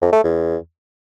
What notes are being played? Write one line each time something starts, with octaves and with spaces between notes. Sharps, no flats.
F2
A3
E2